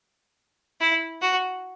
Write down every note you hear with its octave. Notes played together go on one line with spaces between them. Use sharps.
E4
F#4